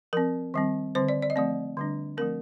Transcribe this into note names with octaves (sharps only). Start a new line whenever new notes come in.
F3 C4 A#4
D#3 G3 C4
D3 G3 C4 C5
D5
D5
D#5
F3 A3 C4 D5
D3 G3 D4
F3 A3 C4 A#4